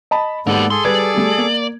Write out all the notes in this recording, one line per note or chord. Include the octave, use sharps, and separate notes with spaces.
D#5 A5 B5
G#2 A#3 B3 G4 A4 D5
G#4 A4 C6
G3 B4 D5 G#6
G3 A3
A#3